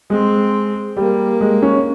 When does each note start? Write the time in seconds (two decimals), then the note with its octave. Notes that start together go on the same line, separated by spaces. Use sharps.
0.10 G#3 C4
0.97 G3 A#3
1.41 G#3
1.62 C#4